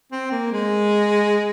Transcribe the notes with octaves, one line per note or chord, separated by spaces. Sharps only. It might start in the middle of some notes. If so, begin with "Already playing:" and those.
C4
A#3
G#3